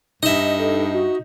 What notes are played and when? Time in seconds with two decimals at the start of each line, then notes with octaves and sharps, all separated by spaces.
0.23 G2 D#4 D#5 E5
0.59 A4
0.93 F#4